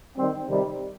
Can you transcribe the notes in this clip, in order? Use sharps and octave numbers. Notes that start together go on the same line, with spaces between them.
D#3 G3 C4
C3 D#3 G3